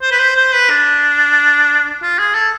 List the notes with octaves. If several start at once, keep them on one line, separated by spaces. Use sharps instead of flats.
C5
B4
C5
C5
B4
D4
F4
G#4
A4